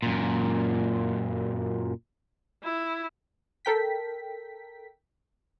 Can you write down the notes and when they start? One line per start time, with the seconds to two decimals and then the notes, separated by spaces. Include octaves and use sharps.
0.02 F#2 A#2
2.63 E4
3.65 A4 A#4 G5 B6